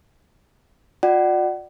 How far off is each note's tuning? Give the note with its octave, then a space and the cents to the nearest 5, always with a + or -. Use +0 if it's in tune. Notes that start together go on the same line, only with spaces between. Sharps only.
F4 +40 D5 +25 F#5 +30